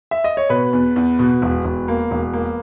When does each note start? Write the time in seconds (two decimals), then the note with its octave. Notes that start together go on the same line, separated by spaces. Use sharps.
0.11 E5
0.24 D#5
0.37 C#5
0.49 B2 B4
0.73 E2
0.96 E2
1.19 B2
1.42 E1
1.64 E1
1.88 A#3
2.11 E1
2.33 A#3